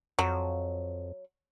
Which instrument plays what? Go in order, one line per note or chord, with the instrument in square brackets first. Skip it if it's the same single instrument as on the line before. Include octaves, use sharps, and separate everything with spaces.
[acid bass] F2 [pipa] F#3